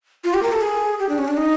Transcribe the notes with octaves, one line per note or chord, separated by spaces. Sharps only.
F4
G4
A#4
A4
G#4
G4
D4
C#4
D4
D#4